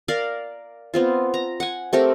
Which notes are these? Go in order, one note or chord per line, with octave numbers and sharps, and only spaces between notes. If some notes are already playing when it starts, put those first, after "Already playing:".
A#4 D5 F5
B3 C4 F4
A#5
F#5 G#5
A3 C4 G4 A#4